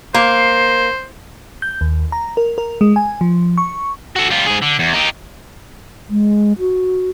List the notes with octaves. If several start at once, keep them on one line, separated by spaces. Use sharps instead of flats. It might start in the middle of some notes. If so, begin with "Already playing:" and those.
A#3 C5
G6
D#2
A#5
A#4
A#4
G#3
G#5
F3
C#6
F#4 A4
G3 F4
G#2 G#4
D3
E2
D#4 G4
G#3
F#4